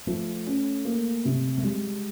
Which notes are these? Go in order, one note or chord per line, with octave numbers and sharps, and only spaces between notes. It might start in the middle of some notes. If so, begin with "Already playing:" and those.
F3 A3
C#4
A#3
C3
A3
G3 G#3